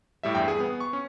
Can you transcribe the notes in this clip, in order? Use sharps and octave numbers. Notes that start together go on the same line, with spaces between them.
A2 G3 E5
E2 G2 G5
G#4 G#5
B3
C#6
C#4